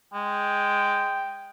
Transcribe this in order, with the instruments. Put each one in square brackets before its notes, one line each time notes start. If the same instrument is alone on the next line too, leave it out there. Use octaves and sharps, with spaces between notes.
[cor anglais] G#3 [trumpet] G5